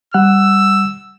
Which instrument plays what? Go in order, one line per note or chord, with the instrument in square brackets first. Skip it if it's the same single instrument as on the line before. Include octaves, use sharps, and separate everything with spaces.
[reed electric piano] G3 F#5 F#6 [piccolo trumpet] E6